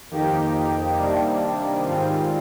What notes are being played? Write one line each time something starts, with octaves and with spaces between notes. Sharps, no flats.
F2 D#3 A#3 D#4 G4
C3 D#3 G3 A#3 D4
G#2 D#3 G3 C4 F4